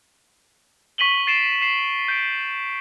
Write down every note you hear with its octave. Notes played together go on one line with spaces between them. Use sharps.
C#6 B6 D#7 F#7 G7
A6 C7 D7 E7
C7 E7
G6 D7